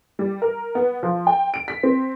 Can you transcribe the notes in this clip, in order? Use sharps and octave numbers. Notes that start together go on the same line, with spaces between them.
G3
A#4
B3
F3
G5
D7
B6
C4